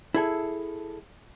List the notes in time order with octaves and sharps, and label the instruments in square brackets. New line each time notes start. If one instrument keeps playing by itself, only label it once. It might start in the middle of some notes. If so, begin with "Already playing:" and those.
[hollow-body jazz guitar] E4 G#4 A4